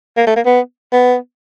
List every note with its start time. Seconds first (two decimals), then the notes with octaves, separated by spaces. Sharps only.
0.17 A#3
0.27 A3
0.36 A#3
0.46 B3
0.93 B3